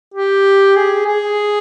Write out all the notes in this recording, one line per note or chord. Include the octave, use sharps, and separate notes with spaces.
G4
G#4
G#4